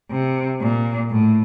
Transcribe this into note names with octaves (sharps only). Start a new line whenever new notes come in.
C3
A#2
A2